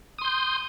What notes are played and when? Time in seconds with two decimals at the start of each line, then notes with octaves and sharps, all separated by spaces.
0.18 D#6
0.22 C6
0.25 G6